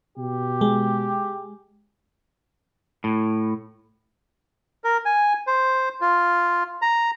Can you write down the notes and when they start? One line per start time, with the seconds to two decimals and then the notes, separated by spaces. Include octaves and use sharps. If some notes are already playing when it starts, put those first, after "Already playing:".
0.18 B2 G4
0.61 G#3
3.04 A2
4.84 A#4
5.05 G#5
5.47 C5
6.01 F4
6.82 A#5